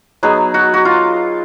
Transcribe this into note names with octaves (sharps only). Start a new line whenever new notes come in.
F#3 B3 D#4 G#4
F#4
F#4
F4